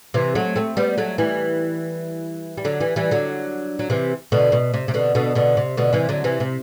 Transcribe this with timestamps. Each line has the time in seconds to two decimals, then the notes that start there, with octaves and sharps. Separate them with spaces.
0.14 C3 E3
0.35 F#3 A3
0.56 A3 C4
0.77 G3 B3
0.97 F#3 A3
1.18 E3 G3
2.57 G3
2.65 D3 F#3
2.81 E3 G3
2.96 E3 G3
3.11 D3 F#3
3.79 F#3
3.90 C3 E3
4.32 B2 D3
4.52 B2
4.74 C3
4.88 C3
4.94 B2 D3
5.15 B2 D3
5.35 B2 D3
5.57 C3
5.77 B2 D3
5.93 C3 E3
6.09 D3 F#3
6.24 C3 E3
6.40 C3